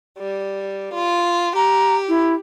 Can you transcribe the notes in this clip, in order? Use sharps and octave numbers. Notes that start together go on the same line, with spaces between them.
G3
F4
G4 A#5
E4